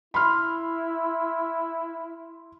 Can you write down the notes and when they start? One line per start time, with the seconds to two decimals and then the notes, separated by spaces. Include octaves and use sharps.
0.14 E4 B5 C6 F6